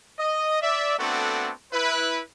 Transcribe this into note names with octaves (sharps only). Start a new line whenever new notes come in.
D#5
D5 E5
A3 B3 C4 D4 F#4 A4
E4 B4